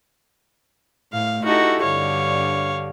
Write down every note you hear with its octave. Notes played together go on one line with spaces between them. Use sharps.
A2 F5
D#4 E4 F#4 G4 A4
G2 D3 C#5 F5